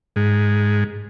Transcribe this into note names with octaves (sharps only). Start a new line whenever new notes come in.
G#2